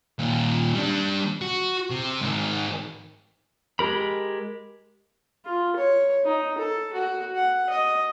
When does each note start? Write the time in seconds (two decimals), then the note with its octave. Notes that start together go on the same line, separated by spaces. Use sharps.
0.19 D#2 A#2
0.75 G3 D4
1.42 F#4
1.90 C3
2.22 G#2 D#3
3.79 G#3 G4 A#4 B5
5.45 F4
5.76 C#5
6.25 D#4
6.58 A4
6.93 F#4
7.36 F#5
7.70 D#5